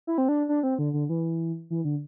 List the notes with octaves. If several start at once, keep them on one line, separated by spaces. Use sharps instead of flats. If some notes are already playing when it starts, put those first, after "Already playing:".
E4
C4
D4
D4
C4
D3
D3
E3
E3
D3